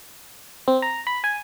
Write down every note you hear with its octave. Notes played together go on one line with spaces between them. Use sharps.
C4
A#5
B5
G#5